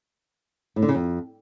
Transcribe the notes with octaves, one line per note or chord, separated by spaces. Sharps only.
A2
D3
C#3
F2